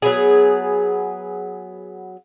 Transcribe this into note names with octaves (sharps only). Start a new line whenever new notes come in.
F#3 B3 G#4